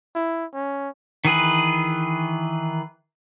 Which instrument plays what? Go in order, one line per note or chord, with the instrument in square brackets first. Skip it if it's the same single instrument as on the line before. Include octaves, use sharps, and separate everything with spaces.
[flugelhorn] E4
C#4
[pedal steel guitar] D#3 E3 G#4 B4